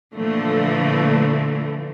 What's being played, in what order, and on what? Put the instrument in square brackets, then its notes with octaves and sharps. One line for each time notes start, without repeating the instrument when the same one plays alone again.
[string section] A#2 D3 E3 F3 A3